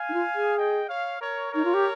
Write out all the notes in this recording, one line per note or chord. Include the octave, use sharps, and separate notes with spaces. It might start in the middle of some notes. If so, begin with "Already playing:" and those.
Already playing: F5 G#5
D#4
F4
G#4
D#5 G5
C#5 F5
A#4 C#5
D#4 A#4 C#5
F4
G4